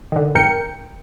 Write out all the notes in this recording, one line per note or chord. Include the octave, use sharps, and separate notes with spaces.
D3 D#3
F2 G#2 A#4 G5 C#7